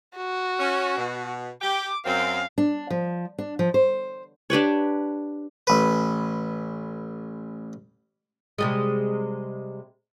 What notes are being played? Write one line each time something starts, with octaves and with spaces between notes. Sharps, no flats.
F#4
C#4
B2
G4 G5 D6
F#2 C4 F5
D4
F3
D4
F3
C5
D4 G4 B4 C#5
A1 B4
C3 G3 G#3